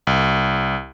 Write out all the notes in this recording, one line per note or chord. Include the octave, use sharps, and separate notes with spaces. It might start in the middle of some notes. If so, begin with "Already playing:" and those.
C2